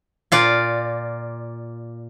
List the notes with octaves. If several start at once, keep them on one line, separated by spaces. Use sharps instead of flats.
A#2 F4 D5